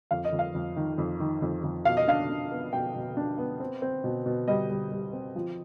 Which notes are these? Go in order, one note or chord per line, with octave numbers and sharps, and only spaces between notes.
F2 F5
D#5
F2
F5
F2
D#3
F2
D#3
F2
F2
B2 F5
D#5
D4 F5
D4
B3
B2 G5
B2
D4
B3
C4
C4
B2
B2
G3 D#5
G3
G3
C4
F3